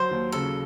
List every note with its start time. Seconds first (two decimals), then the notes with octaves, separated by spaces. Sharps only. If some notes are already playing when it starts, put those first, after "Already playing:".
Already playing: F#3 C5
0.11 D#2
0.32 C#3 A4